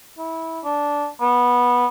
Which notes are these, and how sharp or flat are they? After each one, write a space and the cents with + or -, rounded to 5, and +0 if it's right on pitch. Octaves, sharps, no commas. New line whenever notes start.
E4 -20
D4 -10
B3 -15